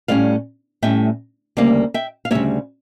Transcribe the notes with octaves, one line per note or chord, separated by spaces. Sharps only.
A2 G3 C#4 D5 F5
A2 G3 C#4 E5 G5
D2 C#3 G3 A#3 D5 F5
E5 G5
F5
D2 C#3 G3 A#3 C#5 E5